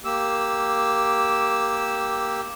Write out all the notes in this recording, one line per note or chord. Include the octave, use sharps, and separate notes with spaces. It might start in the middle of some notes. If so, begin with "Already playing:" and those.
A#3 G4 E6